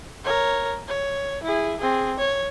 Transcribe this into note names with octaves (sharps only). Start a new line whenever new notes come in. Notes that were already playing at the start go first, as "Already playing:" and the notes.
A#4 C#5
C#5
E4 G#4
C4 G#4
C#5